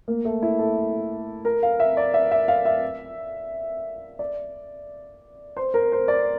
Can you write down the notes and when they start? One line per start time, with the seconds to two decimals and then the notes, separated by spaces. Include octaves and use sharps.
0.08 A#3
0.25 A3
0.42 E4
0.59 A4
1.45 A#4
1.63 F5
1.80 E5
1.97 D5
2.14 E5
2.31 E5
2.48 F5
2.65 E5
4.19 D5
5.57 C5
5.74 A#4
5.92 C5
6.08 D5